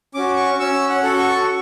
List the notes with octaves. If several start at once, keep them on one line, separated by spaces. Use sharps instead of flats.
C#4 F#4 D6
C#6
C#4 E6
F#5
F#4 A4
C#6